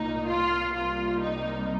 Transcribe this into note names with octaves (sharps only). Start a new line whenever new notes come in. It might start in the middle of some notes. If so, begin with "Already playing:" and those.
Already playing: C2 A#2 A#3 D#4
F4
C2 C3 G3 A#3 F4
D#4